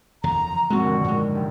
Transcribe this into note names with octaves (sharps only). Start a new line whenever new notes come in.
F#1 E2 D3 A#5
F3
A#1 F#2 G#3 C4 F#4
D3 D#3
G#2 G#3
F1 G4